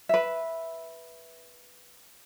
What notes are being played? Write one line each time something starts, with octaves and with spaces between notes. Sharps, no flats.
B4 E5